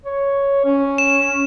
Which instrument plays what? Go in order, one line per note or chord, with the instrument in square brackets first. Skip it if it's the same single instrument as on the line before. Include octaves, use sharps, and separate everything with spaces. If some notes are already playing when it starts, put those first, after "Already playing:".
[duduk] C#5
C#4
[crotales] E7